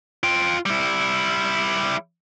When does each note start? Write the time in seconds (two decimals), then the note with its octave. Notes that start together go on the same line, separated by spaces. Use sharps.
0.23 F4 G5
0.66 G3 E4